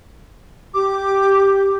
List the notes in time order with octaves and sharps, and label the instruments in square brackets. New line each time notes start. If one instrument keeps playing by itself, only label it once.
[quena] G4 [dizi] D6